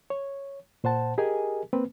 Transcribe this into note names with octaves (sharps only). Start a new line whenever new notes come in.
C#5
A#2 C5 F#5 A5
G4 G#4 A#4 D#5 G#5
A#3 C4 B4